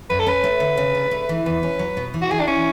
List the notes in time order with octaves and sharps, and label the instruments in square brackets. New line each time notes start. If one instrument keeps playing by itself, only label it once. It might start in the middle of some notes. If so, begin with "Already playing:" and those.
[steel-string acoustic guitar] F#2 [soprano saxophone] B4
[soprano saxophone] A4
[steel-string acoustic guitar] C#4 [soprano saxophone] B4
[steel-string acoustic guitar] A3
D3
C#3
D4
A3
E3
[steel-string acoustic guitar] E2 [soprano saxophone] B4
[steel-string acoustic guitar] C#4
F#3
B2
E3
[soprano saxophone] F#4
[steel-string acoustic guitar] E3 [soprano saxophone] G#4
[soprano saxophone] D4
[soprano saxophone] C#4 [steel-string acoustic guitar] E4